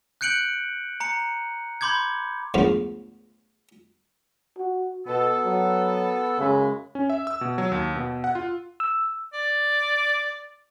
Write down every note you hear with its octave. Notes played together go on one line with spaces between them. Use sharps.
F#6 G6 C#7 D7 F#7
A#5 C#7
B5 C6 D6 G6 G#6
D2 G#2 F3 B3
F#4
B2 B3 A4
F#3
F#2 C#3 G#3 B5
C#4
E5
E6
B2
F#3
D#2
B2
F#5
F4
E6
D5